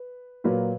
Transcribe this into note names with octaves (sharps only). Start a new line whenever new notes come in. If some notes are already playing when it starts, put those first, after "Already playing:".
Already playing: B4
A#2 F#3 A#3 F4 B4